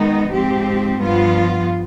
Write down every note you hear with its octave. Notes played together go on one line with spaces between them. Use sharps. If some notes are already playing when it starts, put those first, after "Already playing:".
Already playing: D#3 G#3 B3 D#4
G#2 F3 C4 G4
G2 F3 B3 F4